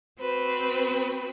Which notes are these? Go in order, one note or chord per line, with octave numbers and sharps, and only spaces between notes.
C4 F#4 B4 C5